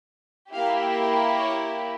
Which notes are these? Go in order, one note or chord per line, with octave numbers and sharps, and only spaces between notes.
A#3 E4 G4 F5
C#5